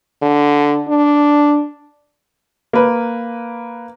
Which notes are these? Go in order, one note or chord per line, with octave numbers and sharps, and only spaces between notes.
D3
D4
A#3 B4